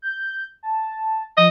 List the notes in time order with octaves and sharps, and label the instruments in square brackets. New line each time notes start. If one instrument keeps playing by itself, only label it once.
[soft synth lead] G6
A5
[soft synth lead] F3 [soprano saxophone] D#5